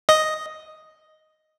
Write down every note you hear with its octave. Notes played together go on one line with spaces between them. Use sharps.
D#5